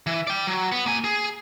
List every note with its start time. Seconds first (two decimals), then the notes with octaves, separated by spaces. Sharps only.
0.07 E3
0.27 D5 G5
0.47 F#3
0.72 B3
0.86 A#3 G#5
1.04 G#4